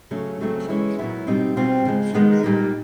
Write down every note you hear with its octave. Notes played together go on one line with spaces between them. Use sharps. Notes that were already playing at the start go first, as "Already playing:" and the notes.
C#3 F#3 A3 C#4
C#3 F#3 A3 C4
E3 G#3 C#4 E4
A#2 F#3 B3 E4
B2 G3 C4 D#4
B2 G3 C4 F4
C#3 F3 G#3
D#3 G#3 B3 D#4
A#2 G3 A#3 D#4